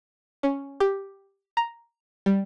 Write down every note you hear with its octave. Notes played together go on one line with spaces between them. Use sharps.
C#4
G4
A#5
G3